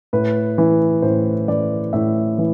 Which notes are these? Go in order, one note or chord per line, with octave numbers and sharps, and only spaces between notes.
A2 B4
E3
A2 C5
E3 D5
A2 E5
E3